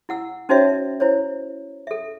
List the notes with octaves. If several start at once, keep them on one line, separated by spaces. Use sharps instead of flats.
E4 F#5 E6
C#4 D#4 F#4 C5 C#5 E5
E4 C5 C#5
A4 E5